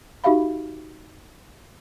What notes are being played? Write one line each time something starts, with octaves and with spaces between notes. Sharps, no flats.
D#4 F#4 G4 E5 F5 B5